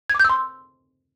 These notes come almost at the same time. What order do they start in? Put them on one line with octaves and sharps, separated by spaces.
G#6 D6 G6 E6 C6